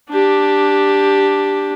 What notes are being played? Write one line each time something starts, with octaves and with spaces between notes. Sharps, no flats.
D4 G4